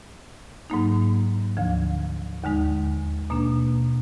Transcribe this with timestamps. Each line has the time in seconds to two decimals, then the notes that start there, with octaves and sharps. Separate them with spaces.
0.70 G#2 F#3 A#3 D#4
1.57 D2 D3 F3
2.44 D#2 D3 G#3 D#4
3.30 B2 A#3 D4